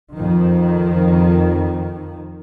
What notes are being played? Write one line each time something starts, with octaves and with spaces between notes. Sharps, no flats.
F2 D#3